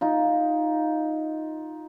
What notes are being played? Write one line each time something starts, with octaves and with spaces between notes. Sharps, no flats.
D#4 F4